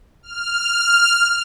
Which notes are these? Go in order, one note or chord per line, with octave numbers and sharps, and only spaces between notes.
F6